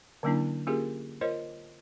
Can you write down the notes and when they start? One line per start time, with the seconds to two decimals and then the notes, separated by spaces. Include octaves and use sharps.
0.23 D3 F#3 A#3 C#4 D4 E4
0.67 A#3 C#4 F4 G4 G#4 A#4
1.21 F4 A#4 C5 C#5 D#5